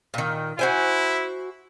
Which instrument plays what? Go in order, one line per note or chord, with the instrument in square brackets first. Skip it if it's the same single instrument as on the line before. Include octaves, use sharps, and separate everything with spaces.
[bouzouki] A#2 D#3
[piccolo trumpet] E4 [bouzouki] F#4 C5 G#5